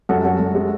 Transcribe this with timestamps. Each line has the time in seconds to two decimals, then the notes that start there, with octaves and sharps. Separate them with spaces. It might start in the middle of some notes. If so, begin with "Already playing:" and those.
0.09 F#2 F#4 A4
0.24 F#2 F#4 A4
0.40 F#2
0.55 G#3